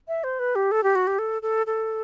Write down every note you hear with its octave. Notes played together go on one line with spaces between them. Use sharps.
E5
C5
B4
G4
A4
G4
F#4
G4
A4
A4
A4